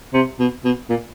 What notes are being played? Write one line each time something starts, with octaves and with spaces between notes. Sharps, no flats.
C3
B2
B2
A#2